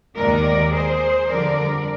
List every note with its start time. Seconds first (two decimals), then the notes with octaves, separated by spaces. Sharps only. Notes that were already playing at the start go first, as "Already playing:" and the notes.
0.18 D#2 D#3 G#3 A#4 D5
0.73 G#4 C5
1.29 F2 D3 G3 A#4 D5